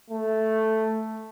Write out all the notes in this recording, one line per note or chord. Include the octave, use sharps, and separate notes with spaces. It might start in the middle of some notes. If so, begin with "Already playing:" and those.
A3